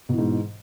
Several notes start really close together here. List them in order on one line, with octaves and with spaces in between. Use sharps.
B2 E3 G#2